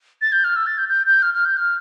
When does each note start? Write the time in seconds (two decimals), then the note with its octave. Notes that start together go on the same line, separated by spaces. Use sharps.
0.22 A6
0.32 G6
0.44 F6
0.56 E6
0.67 A6
0.78 G6
0.89 G6
1.07 G6
1.22 F6
1.34 F6
1.45 G6
1.57 F6